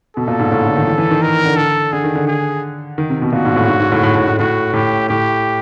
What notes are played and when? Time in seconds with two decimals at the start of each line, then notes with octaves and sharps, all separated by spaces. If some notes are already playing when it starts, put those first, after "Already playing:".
0.16 B2 A4
0.28 A#2
0.39 G#2
0.52 A2
0.63 D3
0.76 D#3
0.87 E3
0.98 E3
1.11 D#3
1.22 A#4
1.45 D3
1.57 A4
1.93 D3 G#4
2.04 D#3
2.15 D3
2.27 G#4
2.98 D#3
3.10 C3
3.22 B2
3.33 A#2 F#4
3.45 G#2
3.56 A2
3.68 G#2
3.80 G#2
3.92 A2
4.03 A2
4.15 A2
4.27 A2
4.39 A2 F#4
4.73 A2 G4
5.09 A2 G4